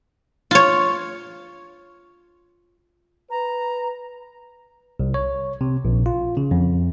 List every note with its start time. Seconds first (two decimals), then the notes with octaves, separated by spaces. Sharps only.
0.51 F4 C#5
3.30 B4 A#5
5.00 C2
5.14 C#5
5.61 C3
5.85 A#1
6.06 F4
6.37 C#3
6.51 F2